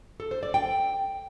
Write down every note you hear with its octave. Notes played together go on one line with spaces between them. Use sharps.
A4
C5
D5
G5